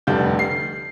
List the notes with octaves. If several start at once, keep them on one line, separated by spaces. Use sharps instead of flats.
F1 D2 G3 D4 G6
C7